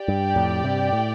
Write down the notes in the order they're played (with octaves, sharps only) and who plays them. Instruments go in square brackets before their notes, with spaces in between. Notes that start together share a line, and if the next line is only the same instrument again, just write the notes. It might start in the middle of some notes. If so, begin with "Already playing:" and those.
Already playing: [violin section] G4 D5 G5
[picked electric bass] G2
F2 A2
G2 C3
A2